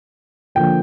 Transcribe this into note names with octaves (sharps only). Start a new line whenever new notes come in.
D3 F3 A#3 G5